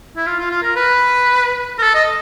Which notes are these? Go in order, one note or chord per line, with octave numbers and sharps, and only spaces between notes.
E4
F4
F4
F4
A#4
B4
A#4
A4
D#5